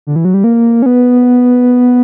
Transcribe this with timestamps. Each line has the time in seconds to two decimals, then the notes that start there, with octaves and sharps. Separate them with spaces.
0.07 D3
0.16 E3
0.25 F#3
0.34 G3
0.44 A#3
0.82 C#4
0.86 B3